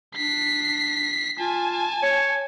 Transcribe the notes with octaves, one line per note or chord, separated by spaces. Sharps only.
D4 B6 C7
F4 G#5 A5
C#5